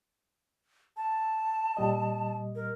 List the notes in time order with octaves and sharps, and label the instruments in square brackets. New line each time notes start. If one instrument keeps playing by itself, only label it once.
[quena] A5
[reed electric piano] A#2 G3 D#5
[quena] A#4